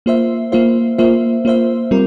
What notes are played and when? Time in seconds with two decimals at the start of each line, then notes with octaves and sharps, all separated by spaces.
0.06 A#3 F4 C5 E5
0.52 A#3 F4 C5 E5
0.98 A#3 F4 C5 E5
1.45 A#3 F4 C5 E5
1.91 G3 C4 F4 A#4